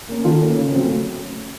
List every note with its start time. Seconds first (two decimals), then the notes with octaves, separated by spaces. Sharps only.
0.08 A#3 C#4
0.24 D#3 F4 A4
0.40 A#3 C#4
0.56 C#3
0.72 F#3 A3 C4